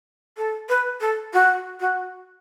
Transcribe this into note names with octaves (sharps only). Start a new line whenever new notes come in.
A4
B4
A4
F#4
F#4